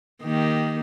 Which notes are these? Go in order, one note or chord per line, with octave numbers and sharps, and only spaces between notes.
D#3 A#3 G4